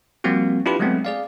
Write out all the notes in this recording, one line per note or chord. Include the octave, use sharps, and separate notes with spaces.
F3 G3 A#3 C4 F#4
D4 E4 F4 G4 B4 B5
F#3 G#3 A3 B3 C4
G#4 D5 F5